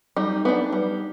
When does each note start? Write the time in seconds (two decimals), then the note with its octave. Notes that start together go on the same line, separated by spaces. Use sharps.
0.16 G3 D#4
0.45 B3 D4
0.72 G3